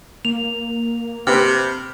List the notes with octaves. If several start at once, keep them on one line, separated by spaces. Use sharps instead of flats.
A#3 F7
C3 G4 B4 F6